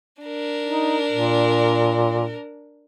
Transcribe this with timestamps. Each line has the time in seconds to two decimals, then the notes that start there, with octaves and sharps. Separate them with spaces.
0.22 D4 A#4
0.65 D#4
1.11 A#2